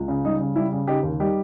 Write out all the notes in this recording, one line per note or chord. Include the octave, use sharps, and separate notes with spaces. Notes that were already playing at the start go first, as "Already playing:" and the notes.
Already playing: C#2
C#3
G3 D#4
C#3
G3 E4
C#3
C#3 D#4 G4
D#2
G3 D#4 G4